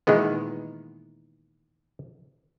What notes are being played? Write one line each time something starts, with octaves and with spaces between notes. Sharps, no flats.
A#2 D#3 E3 G#3 B3